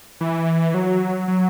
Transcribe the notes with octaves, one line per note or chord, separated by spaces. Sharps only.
E3
F#3
F#3